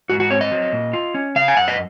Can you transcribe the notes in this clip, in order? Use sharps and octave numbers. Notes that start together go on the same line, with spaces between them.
G#2 F#4
F#4
C4 C#5
D#5
F#3
A#2
F4
C#4
C#3 F5
G#5
F#2 F#5
D#5